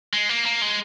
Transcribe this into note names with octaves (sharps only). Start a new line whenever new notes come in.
G#3
A#3
A#3
G#3